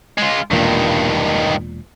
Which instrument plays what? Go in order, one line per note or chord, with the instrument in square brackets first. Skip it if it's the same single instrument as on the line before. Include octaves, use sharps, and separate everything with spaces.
[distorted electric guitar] G#3 F4
[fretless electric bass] E1 A#2 [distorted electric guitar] G2 D#3